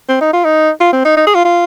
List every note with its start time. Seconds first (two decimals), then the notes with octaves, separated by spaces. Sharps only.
0.09 C4
0.21 D#4
0.33 F4
0.45 D#4
0.80 F4
0.93 C4
1.05 D#4
1.17 D#4
1.27 G#4
1.35 F4
1.45 F4